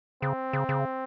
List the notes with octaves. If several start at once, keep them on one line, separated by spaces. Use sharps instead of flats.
C#3 C4
C#3
C#3